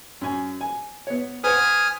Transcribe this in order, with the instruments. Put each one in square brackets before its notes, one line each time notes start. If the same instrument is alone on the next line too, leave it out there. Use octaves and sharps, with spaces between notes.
[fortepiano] F#2 G#5
G#5
B3 C#5
[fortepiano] B4 C5 F#5 [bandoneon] G#5 D#6 F6